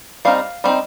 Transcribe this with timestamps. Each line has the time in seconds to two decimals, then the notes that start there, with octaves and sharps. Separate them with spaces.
0.25 G3 C4 D#4 F5
0.64 G3 C4 D#4